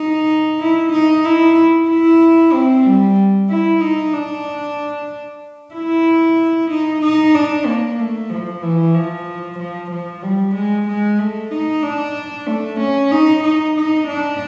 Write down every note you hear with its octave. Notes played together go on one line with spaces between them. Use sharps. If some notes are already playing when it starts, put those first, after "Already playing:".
Already playing: D#4
E4
D#4
E4
E4
C4
G3
E4
D#4
D4
E4
D#4
D#4
D4
A#3
A3
F3
E3
F3
F3
F3
G3
G#3
G#3
A3
D#4
D4
A3
C#4
D#4
D#4
D#4
D4